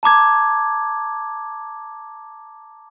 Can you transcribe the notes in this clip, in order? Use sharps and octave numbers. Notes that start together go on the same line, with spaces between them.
A5 A#5 D6 G#6